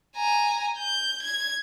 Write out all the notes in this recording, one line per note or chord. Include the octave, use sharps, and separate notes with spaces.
G#5 A#5
G6
G#6